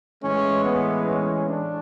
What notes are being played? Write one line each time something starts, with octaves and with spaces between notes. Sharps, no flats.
A2 E3 G#3 C#4
B3
C#4
D4